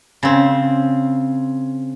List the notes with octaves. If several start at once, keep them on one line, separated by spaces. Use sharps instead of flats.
C#3 C4